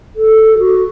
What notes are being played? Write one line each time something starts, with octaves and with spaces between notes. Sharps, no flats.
A4
F#4